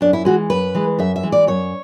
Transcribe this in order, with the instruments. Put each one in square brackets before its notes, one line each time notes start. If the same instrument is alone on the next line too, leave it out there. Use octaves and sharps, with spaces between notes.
[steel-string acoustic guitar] F#2 D4
E4
E3 G#3 F#4
F#2 B4
E3 G#3
F#2 E5
E5
E3 G#3
D5
F#2 C#5